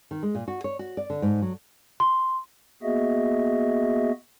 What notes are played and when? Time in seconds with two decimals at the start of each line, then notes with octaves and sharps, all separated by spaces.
0.11 D#3
0.23 G#3
0.35 A#2
0.48 F#4
0.64 C#5
0.79 F#4
0.97 D5
1.10 D3
1.22 G#2
1.42 F#3
2.00 C6
2.83 A#3 B3 F#4 G#4 D#5 E5